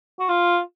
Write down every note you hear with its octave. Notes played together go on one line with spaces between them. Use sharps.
F#4
F4